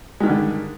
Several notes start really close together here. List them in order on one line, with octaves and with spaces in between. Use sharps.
G#3 D#3 G2 D3